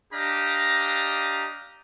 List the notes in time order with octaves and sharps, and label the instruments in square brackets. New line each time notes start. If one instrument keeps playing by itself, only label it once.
[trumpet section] D4 G4 D#5 F5 A#5